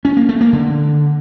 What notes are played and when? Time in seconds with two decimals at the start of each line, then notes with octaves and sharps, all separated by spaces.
0.05 C#4
0.17 A#3
0.29 A3
0.41 A#3
0.53 D3